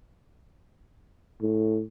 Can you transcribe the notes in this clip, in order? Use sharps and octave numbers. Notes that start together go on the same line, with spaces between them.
A2